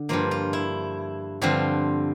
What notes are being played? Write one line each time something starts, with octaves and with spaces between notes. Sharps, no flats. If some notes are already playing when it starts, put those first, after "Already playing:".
Already playing: D3
G2 F3 A#3 F4
F4
E4
G2 D3 F3 C4 F4